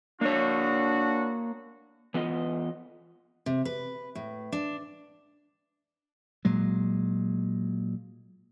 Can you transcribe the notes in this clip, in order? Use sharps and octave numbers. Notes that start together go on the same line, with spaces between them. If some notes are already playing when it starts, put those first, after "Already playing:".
A#3 D4 F#4 C#5
E3 B3 F4 D#5
C3
B4
A2
D4
A#2 F#3 G#3